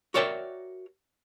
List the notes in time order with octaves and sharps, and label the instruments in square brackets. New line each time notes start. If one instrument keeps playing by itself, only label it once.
[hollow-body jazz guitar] F#4 A#4 C#5 D5 E5 G5